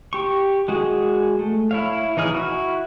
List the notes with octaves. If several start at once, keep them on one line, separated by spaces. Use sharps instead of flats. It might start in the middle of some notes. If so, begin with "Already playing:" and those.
G4 C#6
G#3 F#4 G#4
A3
E4 C#5 F5
E3 D#4 G#4 F6
E4 F#4